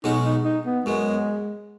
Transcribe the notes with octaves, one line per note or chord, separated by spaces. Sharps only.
B1 B2 G#3 C#4 D#4 F#4
D#4
D#4
B3
F#2 F#3 G#3 B3